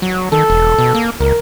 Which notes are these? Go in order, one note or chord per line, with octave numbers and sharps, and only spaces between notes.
F#3
D#3 A4
E1
B2
A#3
C#2 A#4